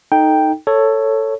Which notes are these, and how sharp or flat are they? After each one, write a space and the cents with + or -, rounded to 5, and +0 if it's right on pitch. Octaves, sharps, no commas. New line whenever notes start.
D#4 +0 A4 +0 G5 +0
A4 +10 C#5 +0